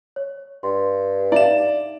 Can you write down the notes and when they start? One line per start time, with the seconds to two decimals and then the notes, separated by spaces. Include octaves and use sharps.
0.16 C#5
0.63 G2 C6
1.32 D#4 D5 E5 F5 E7